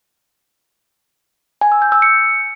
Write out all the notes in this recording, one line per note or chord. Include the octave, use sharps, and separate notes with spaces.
G#5
E6
G6
E6
C#7